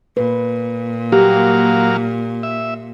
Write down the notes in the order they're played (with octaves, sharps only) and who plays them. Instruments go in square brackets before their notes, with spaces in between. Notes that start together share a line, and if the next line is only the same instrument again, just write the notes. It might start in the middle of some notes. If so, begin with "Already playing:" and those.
[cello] A#2 [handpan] B4
[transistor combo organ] F#3 A#3 F5 [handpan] G4
[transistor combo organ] E5